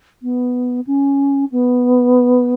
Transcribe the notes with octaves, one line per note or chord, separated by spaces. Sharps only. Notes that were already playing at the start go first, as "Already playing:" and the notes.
B3
C#4
B3